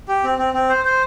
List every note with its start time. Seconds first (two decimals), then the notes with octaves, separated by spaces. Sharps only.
0.08 G4
0.24 C4
0.38 C4
0.54 C4
0.69 C5
0.85 C5